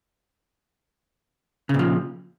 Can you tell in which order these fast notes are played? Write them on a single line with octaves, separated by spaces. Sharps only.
C#3 A#2 F3